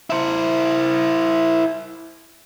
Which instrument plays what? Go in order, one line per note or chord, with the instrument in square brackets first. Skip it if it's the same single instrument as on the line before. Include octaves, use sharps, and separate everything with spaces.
[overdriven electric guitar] E4 C5